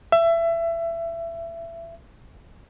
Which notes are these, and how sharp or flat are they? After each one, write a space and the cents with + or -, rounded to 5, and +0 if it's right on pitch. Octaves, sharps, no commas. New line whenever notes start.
E5 +25